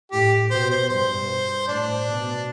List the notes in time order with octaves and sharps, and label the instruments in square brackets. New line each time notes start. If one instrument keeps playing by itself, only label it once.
[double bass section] A2 [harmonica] G4
[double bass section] B2 [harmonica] C5
[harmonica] C5
[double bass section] G2 [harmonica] C5
[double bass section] A2 [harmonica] D4
[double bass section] B2